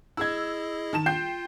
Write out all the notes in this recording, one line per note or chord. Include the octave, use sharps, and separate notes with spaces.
E4 G#4 D#5 E6 G#6
D#3 A5 E7
F4 G5 G6 C7